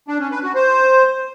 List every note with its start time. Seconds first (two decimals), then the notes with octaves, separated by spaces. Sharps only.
0.08 D4
0.20 C#4
0.31 B4
0.43 F#4
0.55 C5